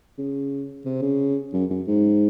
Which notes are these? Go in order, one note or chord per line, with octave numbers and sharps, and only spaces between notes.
C#3
C3
C#3
F#2
F#2
G#2